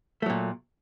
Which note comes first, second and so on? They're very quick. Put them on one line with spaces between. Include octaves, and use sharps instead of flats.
A3 F#3 A#2